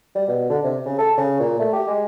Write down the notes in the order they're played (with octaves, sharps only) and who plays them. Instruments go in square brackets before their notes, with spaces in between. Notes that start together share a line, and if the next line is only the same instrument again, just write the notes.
[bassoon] G3
B2
D3
C3
C#3
A4
C#3
A#2
A3
G4
G#3